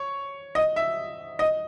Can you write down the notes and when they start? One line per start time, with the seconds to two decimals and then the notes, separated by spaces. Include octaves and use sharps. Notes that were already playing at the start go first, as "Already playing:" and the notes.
Already playing: C#5
0.55 D#5
0.76 E5
1.39 D#5